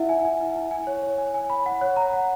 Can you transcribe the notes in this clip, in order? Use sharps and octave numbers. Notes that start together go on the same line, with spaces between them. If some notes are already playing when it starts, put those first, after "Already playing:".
Already playing: E4 E5 F#5
G#5
G#5
E4
E4
G#5
C#5
C#5
G#5
G#5
B5
F#5
C#5
A#5
F#5